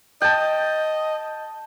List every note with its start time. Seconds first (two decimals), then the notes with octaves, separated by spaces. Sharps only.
0.22 D#5 G5 A5